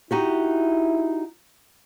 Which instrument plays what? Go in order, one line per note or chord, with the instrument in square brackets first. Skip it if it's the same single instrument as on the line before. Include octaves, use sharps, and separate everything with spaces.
[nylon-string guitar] D#4 F#4 G4 [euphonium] E4